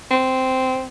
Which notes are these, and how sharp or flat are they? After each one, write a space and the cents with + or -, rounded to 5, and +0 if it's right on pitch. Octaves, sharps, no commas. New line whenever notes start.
C4 -10